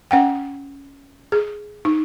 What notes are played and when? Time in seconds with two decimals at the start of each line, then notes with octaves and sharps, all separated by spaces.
0.11 C#4 F#5 G5
1.32 G#4
1.85 D#4